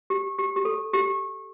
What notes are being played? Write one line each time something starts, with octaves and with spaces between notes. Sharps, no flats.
G4
G4
G4
A4
G4